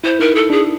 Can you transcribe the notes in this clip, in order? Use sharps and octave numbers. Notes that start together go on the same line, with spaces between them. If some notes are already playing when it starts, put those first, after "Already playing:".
E4 C5
D#4 A#4
A4
D4 G#4